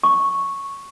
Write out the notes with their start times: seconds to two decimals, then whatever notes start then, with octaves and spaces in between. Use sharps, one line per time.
0.03 C#6